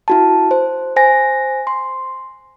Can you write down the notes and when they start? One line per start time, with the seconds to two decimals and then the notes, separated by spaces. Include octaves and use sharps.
0.08 E4 F#4 A5
0.51 C5
0.96 C5 G#5 A#6
1.67 C6